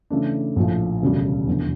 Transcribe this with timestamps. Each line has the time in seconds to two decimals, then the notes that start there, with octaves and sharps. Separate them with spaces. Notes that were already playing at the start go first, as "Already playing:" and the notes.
0.10 C#3 E3 A3 D4
0.56 A#1 A2 F3
1.02 E1 D2 C#3 G3
1.47 F1 E2 D3